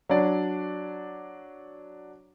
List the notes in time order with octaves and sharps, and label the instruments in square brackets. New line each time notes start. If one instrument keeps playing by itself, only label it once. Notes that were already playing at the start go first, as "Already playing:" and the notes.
[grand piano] F#3 D4 D5